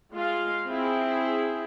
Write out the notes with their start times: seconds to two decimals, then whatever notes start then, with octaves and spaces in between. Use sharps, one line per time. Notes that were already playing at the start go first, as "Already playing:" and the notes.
0.14 G#3 F4 F5
0.67 C4 E4 G#4